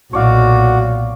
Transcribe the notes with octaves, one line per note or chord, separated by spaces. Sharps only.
B1 A#2 F#4 C#5 D5 F5